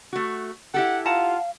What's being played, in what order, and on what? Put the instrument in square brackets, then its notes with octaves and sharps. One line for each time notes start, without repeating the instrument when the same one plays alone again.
[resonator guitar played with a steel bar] A3 F#4
[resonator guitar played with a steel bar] E4 G4 A4 [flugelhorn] F#5
[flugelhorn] F4 [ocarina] F5 [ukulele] F#5 A5 A#5